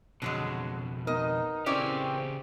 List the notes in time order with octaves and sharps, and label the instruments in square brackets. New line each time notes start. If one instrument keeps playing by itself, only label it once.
[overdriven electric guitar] F2 B2 [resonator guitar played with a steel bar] D3 F#3 G#3
[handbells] B3 A#4 [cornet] D#4 [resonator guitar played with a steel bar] D#5
[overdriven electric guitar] C#3 G4 [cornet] C4 [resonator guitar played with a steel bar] C#4 E4 D5